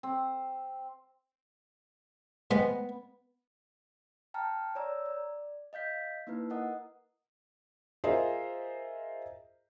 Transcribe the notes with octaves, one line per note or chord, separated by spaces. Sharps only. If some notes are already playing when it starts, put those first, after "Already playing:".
C4
G#2 G#3 B3
G5 A5 A#5 F6
C#5 D5 A#5 E6
D5
D#5 F5 G6 B6
A#3 D#4 E4 B4
A#4 D#5 F#5 D#6
F4 G#4 A#4 C5 D#5 E5